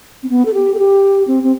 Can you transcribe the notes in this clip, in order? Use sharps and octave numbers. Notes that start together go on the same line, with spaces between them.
C4
B3
A4
G4
A4
G4
C4
C4